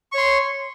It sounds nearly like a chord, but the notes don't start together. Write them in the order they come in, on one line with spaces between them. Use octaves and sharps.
C#6 C#5 C6